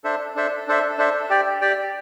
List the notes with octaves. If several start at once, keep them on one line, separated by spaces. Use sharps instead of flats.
D4 A4 C5 E5
D4 A4 C5 E5
D4 A4 C5 E5
D4 A4 C5 E5
G4 D5 G5
G4 D5 G5